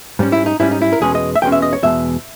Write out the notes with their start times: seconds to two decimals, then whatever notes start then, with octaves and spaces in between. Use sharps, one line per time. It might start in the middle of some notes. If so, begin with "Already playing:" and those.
0.19 G#2 G3 C#4
0.32 E4
0.46 D#4
0.60 G#2 G3 C#4 E4
0.71 D#4
0.81 E4
0.93 A#4
1.00 E2 B2 G#3 C#4 G#4
1.15 D#5
1.36 E5
1.42 E2 B2 G#3 C#4 G5
1.52 E5
1.62 D#5
1.73 C#5
1.83 E2 B2 G#3 E5